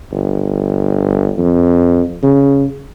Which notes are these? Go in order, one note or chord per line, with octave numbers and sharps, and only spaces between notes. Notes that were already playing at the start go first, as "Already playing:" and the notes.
G1
F2
C#3